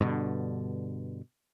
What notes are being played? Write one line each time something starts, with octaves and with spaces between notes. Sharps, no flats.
G2 B2 D3